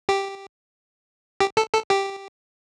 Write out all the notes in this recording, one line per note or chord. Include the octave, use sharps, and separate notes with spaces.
G4
G4
A4
A4
G4